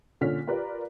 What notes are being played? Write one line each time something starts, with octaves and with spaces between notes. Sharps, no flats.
A#2 D3 C#4 F6 B6
F4 G4 A#4 B4 D5